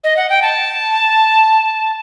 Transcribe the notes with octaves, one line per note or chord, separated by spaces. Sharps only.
D#5
F#5
G5
A5